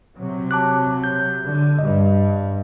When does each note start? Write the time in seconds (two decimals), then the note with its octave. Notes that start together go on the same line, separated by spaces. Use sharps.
0.16 C3 F#3
0.51 A5 D6 F#6
1.04 G6
1.43 D3
1.79 G2 D#5